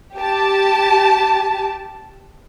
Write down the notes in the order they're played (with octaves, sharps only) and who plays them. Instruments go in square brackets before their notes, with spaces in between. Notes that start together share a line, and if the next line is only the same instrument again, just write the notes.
[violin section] G4 A5